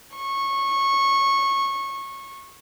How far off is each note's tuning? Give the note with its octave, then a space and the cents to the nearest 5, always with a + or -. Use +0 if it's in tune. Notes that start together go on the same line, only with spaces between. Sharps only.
C#6 -20